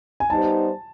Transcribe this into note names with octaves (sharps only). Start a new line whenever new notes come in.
G#5
G3 B3 D#4 G4 C5 A5